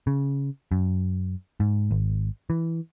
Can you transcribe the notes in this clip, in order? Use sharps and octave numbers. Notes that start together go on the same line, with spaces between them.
C#3
F#2
G#2
G#1
E3